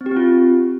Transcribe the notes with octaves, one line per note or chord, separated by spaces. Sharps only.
C4
G4
C4
F4